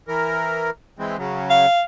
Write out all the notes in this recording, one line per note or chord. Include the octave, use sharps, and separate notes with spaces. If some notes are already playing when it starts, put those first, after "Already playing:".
E3 A#4
E3 G#3 C4
C#3 F#3
F5